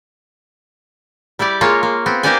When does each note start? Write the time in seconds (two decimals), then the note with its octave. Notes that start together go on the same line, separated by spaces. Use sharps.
1.39 G3 E4 G4 D5
1.61 G#3 A#3 F4 C#5
1.83 A#3
2.06 B3 C4
2.23 A#3 D#4 G4 C5 D5 G#5